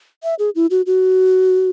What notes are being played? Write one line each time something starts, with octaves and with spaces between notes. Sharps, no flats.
E5
G#4
E4
F#4
F#4